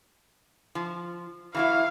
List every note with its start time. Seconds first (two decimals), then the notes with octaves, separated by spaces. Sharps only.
0.75 F3
1.55 E3 F#3 E4 F5